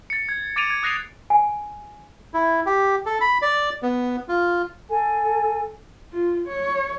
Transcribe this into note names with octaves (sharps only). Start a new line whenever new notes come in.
A6 C#7
G#6
D6 A6 D7 D#7 F7
G#6
D#6 F#6 A#6 C7 D#7 F7
G#5
E4
G4
A4
B5
D5
B3
F4
A4 G#5
F4
C#5